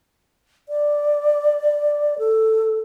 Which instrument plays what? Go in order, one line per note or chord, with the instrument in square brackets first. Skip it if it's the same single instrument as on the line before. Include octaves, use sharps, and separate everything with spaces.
[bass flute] D5
A4